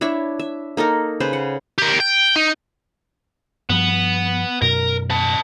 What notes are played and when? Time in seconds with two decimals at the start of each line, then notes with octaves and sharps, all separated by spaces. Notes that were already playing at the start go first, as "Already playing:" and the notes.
0.01 D4 E4 C#5 E5
0.39 E5
0.77 A#3 D#4 A4 A#4
1.20 C#3 B4 C5
1.33 F#5
1.78 G4 A#4
2.00 G5
2.36 D#4
3.69 G2 F3 B3
4.62 F#2 B2 A#4
5.10 B4 A5